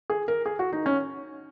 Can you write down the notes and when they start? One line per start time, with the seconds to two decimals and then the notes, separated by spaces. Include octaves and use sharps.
0.10 G#4
0.28 A#4
0.46 G#4
0.59 F#4
0.72 D#4
0.86 C#4